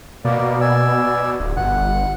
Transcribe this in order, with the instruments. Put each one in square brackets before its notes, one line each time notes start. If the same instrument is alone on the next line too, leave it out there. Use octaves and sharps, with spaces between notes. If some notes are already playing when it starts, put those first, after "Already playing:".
[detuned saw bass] B2 [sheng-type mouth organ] A#3 D5
[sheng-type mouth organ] D5 G#5 E6
[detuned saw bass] D1
[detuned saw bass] G1 [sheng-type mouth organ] F#5